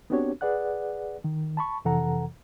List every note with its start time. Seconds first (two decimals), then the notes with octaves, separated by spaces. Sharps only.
0.10 B3 C4 D4 F#4 G4 C#5
0.41 G#4 B4 D5 F#5 F#6
1.24 D#3
1.57 A5 B5 C#6
1.85 F2 C3 E3 A4 F#5 A#5